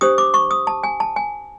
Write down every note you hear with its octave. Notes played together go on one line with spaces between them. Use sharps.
D4 G4 C5 D#6
D6
C#6
D#6
A5
G#5
A5
G#5